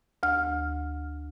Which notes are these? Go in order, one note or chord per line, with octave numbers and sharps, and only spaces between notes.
D2 F6